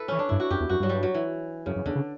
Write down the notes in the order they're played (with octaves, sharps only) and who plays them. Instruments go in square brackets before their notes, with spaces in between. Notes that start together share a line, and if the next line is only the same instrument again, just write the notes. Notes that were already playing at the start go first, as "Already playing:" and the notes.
Already playing: [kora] E4 A4 B4
[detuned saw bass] E3 [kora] C#4
[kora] D4
[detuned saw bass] G2 [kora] E4
[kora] F#4
[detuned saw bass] F#2 [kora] G4
[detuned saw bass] E2
[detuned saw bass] F#2 [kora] F#4
[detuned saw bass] G2 [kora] F#3
[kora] G3
F#3
E3
[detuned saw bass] F#2 [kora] C#3
[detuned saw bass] F#2
[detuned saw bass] E2 [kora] D3
[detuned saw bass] C#3